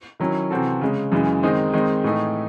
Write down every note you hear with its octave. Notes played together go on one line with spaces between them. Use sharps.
D#3 F#3 C#4 E4
C3 E3 C4 F#4 A4
C#3 G#3 C#4
F#2 C#3 E3 G#3
D#3 G#3 C4 D#4
D#3 G#3 C4 D#4
A2 E3 A3 D#4